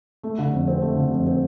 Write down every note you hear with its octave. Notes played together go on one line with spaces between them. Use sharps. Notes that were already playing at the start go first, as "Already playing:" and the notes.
A3
D3
F2
C4
A3
D3
F2
C4